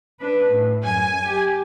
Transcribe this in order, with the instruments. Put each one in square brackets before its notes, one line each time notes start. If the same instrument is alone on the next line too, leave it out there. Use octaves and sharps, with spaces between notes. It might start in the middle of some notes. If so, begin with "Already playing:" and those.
[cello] D4 B4
A2
[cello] F#2 [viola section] G#5
[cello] G4